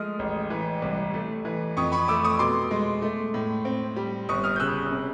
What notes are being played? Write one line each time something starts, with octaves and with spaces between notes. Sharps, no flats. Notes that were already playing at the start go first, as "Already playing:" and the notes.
Already playing: F3 G#3 A3 D#6 F6
A1
E3
C2
A3
E3
F2 C#6 D#6
B5 C#6
A3 D6 E6
C#6 D#6
B2 C6 D6
G#3
A3
A2
C4
G3
G1 C#6 D#6
D#6 F6
G6
C#3 E6 F#6
C3